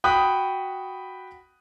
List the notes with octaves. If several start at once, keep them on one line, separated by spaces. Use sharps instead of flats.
F#4 G5 B5 D#6 F#6